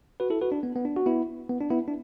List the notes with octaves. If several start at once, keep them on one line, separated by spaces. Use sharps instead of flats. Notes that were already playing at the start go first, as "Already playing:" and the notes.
F#4 B4
E4 A4
F#4 B4
D4
B3
B3
D4
F#4
B3 E4
B3
D4
B3 E4
D4